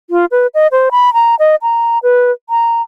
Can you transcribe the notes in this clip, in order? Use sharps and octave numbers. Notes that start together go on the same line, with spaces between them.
F4
B4
D#5
C5
B5
A#5
D#5
A#5
B4
A#5